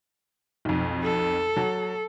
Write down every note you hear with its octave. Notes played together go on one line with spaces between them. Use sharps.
B1 F2
A4
F#3 A5